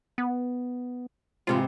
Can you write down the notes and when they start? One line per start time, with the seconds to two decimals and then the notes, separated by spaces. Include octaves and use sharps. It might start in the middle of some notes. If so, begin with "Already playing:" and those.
0.18 B3
1.47 G#2 C3 E3 F4